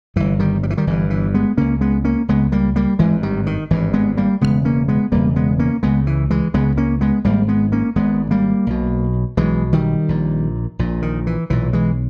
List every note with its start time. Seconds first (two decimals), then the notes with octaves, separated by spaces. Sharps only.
0.16 G1 G2 E3
0.39 D#3 G3
0.63 G3
0.70 E3
0.77 D#3 G3
0.87 G1 G2 E3
1.10 E3
1.34 G#3 B3
1.57 C#2 C#3 A#3 C#4
1.81 G#3 B3
2.05 A#3 C#4
2.28 C#2 C#3 G#3 B3
2.52 G3 A#3
2.76 G3 A#3
2.99 G#1 G2 E3 G#3
3.23 D#3 G3
3.47 D#3
3.70 G#1 G2 E3
3.94 G#3 B3
4.17 G3 A#3
4.41 E1 E2 C#3 G#3 B3
4.65 A#3 C#4
4.88 G#3 B3
5.12 E1 E2 C#3 G3 A#3
5.36 G#3 B3
5.59 A#3 C#4
5.83 C#2 C#3 G#3 B3
6.07 E3
6.31 E3 G#3
6.54 C#2 C#3 G#3 B3
6.77 A#3 C#4
7.01 G#3 B3
7.24 G#1 G#2 G3 A#3
7.48 G#3 B3
7.72 A#3 C#4
7.96 G#1 G#2 G#3 B3
8.31 G3 A#3
8.67 B1 B2
9.37 B1 B2 E3 G#3
9.73 D#3 G3
10.09 A#1 A#2
10.79 A#1 A#2
11.02 D#3
11.27 E3
11.50 B1 A#2 E3
11.73 E3 G#3